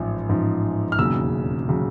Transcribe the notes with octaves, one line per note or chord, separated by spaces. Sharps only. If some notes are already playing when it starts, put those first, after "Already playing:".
Already playing: A1 G#2 F3
A1 G#2 F3
F6
E1 D#2 C#3 F#3 E6
C#3 F#3